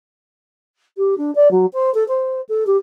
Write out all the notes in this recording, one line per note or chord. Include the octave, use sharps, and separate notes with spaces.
G4
D4
D5
F#3
C5
A4
C5
A4
G4